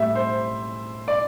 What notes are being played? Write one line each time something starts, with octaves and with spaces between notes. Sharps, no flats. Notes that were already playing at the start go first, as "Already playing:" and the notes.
Already playing: A2 G3 E5
C5
D5